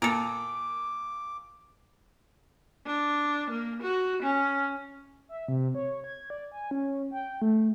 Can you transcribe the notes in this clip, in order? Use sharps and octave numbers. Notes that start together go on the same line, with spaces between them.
A#2 A4 A#4 D6
D4
A#3
F#4
C#4
E5
C3
C#5
G#6
D5
G#5
C#4
G5
A3